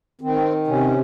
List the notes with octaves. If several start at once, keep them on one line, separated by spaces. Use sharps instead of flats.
D#3 C4
C3 C#4